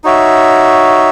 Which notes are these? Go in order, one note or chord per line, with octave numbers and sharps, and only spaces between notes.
D#4 F#4 C#5 E5